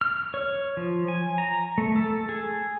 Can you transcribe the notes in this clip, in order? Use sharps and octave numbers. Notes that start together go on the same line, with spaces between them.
F6
C#5
F3
G#5
A#5
A3
A4
G#4